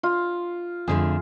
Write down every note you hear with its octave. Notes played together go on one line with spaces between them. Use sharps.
F4
F2 D3 A3 G#4